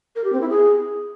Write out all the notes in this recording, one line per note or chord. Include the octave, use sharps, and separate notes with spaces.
A#4
G4
C4
E4
G#4